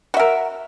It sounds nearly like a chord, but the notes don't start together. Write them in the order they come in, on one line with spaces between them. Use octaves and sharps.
F#4 E5 A#4